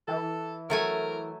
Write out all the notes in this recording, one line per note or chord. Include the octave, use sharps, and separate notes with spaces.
E3 A4
F#3 A3 A#4 G#5